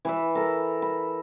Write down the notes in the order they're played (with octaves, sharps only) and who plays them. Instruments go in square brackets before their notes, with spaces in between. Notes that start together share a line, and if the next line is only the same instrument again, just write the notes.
[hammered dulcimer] E3 B4 E5
A4 A#4
B5